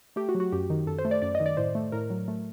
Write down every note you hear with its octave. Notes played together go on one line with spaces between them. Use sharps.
A3 G4
F#4
F#3
F#4
F#2 G4
D#3
F#2 A4
C5
A3
D5
F#2 D5
D#5
D#3
D5
A2 C5
A3
A2 A#4
F#3
A3